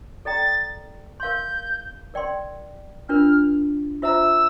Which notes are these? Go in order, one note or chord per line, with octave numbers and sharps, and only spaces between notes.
A4 D5 G5 A#5 A6
A#4 F5 C6 G6
A#4 D5 G5 C6
D4 F4 A#4 F6
F4 C5 E5 A#5 E6